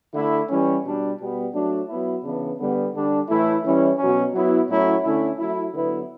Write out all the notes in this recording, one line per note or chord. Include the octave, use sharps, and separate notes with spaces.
D3 A3 E4
E3 G3 C#4
B2 G3 D4
B2 G3 B3
F#3 A3 D4
F#3 B3 E4
C#3 E3 B3 D4
D3 G3 B3
D3 G3 D4
A2 E3 A3 E4
E3 G3 C#4 E4
B2 F#3 C#4
F#3 B3 E4
A2 F#3 A3 C#4 E4
D3 A3 C#4 E4
F#3 A3 E4
D3 F#3 B3 E4